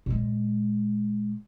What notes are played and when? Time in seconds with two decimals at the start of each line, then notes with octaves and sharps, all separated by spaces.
0.06 A#2 G#3